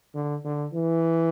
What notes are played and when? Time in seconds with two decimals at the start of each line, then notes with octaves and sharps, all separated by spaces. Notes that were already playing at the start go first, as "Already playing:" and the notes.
0.15 D3
0.45 D3
0.74 E3